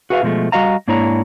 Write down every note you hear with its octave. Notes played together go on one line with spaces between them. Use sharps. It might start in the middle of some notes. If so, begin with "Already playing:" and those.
F#4 G#4 B4 E5 F5
B2 F3 G#3 A3
G3 F#4 D#5 F5 A#5
G#2 A#3 D4 E4 C#5 A#5